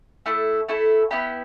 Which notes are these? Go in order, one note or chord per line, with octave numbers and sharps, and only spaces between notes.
A3 E4 A4
A3 E4 A4
B3 E4 G4 B5